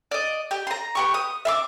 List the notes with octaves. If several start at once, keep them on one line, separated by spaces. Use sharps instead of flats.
D5 D#5
G4
A#5 C6
B3 G4 C#6
D#6
E5 C6 D6